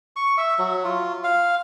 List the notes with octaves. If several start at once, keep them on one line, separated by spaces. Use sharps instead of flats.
C#6
E5
F#3
F4
F5